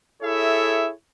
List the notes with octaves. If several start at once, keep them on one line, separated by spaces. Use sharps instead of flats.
E4 G#4 A4 C#5 E5